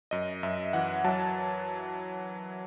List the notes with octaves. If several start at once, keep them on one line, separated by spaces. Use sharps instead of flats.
F#2 D#5
F#2 E5
E3 F#5
F#3 A5